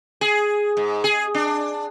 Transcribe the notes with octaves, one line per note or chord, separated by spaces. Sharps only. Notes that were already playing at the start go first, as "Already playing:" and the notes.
G#4
G#2
G#4
D4